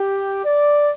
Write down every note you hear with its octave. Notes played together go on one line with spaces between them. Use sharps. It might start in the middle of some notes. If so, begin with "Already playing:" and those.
Already playing: G4
D5